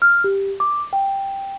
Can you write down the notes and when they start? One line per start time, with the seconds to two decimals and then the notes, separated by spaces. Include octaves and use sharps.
0.02 F6
0.24 G4
0.60 D6
0.93 G5